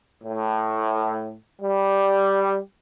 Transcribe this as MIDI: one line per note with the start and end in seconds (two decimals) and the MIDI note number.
0.24 1.33 45
1.61 2.58 55